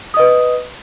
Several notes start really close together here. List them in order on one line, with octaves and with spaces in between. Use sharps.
D#6 D#5 B4